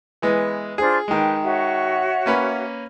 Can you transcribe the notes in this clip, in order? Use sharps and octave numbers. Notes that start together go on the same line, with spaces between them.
E3 G#3 B3
D4 F4 G#4 C5
D#3 G#3 B4 G5
F#4 C#5 E5
A#3 C#4 B4